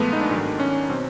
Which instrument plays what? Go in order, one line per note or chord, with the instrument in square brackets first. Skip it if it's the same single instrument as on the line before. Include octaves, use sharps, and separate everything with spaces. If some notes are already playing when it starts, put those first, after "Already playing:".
Already playing: [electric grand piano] A#2 F3 G#3 A3 B3
D#4
D4
G#2 D#3 F#3
C#4
B2 F#3 C4